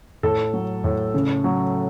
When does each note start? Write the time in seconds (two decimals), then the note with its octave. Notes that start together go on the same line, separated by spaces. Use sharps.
0.23 A2 A4
0.53 F#3
0.84 A2
1.14 C#3
1.44 F#3